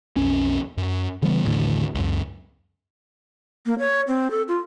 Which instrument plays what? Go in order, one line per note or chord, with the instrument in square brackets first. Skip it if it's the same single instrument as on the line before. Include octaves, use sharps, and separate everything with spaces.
[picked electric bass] B1 F2 C#4
F#2
C#3 E3 G3 B3
A1 D#2 A2 D3
C#2 F#2
[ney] A#3
C#5
C4
A4
F4